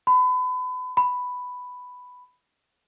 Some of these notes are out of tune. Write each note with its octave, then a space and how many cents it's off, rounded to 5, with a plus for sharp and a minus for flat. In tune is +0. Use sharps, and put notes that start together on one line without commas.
B5 +35
B5 +5